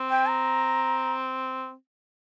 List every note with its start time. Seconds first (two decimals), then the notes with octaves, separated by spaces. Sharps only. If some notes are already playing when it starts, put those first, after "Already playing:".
Already playing: C4
0.10 G5
0.28 A#5